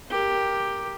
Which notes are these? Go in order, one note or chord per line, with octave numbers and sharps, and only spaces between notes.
G4 A#4